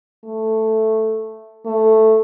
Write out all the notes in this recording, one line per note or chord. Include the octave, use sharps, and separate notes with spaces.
A3
A3